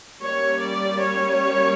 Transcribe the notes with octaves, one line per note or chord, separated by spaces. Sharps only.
G3 A#3 C#4 C#5
D5
C#5